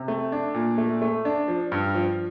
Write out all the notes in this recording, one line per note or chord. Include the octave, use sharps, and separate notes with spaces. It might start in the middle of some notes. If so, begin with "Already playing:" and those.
Already playing: C3
A3
D4
A#2
A3
A3
D4
F3
G2
F3